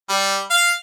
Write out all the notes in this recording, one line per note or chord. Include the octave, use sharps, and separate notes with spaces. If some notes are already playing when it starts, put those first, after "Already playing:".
G3
F5